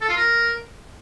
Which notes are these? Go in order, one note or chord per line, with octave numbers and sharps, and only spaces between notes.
A4
F4
A#4